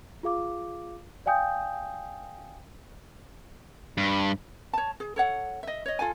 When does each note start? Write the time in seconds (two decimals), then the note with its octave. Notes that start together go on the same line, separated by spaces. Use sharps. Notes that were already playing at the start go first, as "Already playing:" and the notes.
0.23 F4 G#4 F5 D6
1.26 D5 F5 G5 G#5 D#6 G6
3.98 G2
4.73 C#5 A5
5.00 G#4
5.16 A4 C#5 F#5
5.63 D#5 E5
5.86 C#5 D#5
5.99 F4 A4 F5 G#5